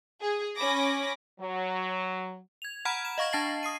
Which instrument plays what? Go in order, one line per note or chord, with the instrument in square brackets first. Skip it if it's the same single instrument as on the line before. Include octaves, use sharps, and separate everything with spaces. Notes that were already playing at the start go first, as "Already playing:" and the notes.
[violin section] G#4
C#4 B5 D6 A#6
[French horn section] F#3
[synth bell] G#6 F7
F#5 A#5 B5 F6 G#6 D7
E7
D#5 F5 C#6 G#6 A#6
D4 A5 A6 C7 F#7
D#6 C7 D#7